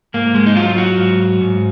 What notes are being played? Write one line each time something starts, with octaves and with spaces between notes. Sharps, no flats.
G#2 A#3
G#3
D#4
F#3 F4
F#4
G#2
G#2